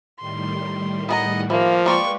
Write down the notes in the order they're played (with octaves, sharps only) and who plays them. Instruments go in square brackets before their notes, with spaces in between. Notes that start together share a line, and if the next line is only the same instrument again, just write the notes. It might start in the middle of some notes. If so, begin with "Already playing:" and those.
[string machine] A2 D#3 G3 [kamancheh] C6
[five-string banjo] B3 G#4 A#5 [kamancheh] D#5 F#5
[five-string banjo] E3 [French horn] F3 [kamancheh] A#3
[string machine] G#3 B4 [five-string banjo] A#3 F4 D5 [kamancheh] G5 C#6